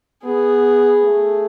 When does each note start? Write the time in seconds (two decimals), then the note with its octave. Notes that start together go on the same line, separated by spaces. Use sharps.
0.24 B3 G#4
1.04 A3